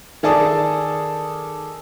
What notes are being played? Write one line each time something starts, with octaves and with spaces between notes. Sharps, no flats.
D#3 G#4 A4 D5 A5 D#6